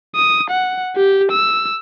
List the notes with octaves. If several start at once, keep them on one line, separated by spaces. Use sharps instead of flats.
D#6
F#5
G4
E6